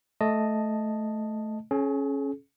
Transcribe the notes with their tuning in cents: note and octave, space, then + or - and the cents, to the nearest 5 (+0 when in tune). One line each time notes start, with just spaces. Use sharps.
A3 -10 D#5 -5 A5 +0
C#4 -10 G#4 +45